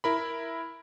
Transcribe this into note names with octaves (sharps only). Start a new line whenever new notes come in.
E4 A#4 B5